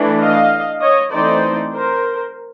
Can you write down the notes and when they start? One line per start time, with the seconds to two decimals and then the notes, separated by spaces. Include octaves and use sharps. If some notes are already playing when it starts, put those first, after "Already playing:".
Already playing: E3 A3 D4
0.19 D#5 F5
0.81 C#5 D#5
1.12 E3 A3 C4 D#4 C5 D5
1.74 A#4 C5